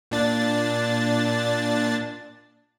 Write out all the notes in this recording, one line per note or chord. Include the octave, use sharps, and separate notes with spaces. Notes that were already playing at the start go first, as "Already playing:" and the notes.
A#2 D4 A6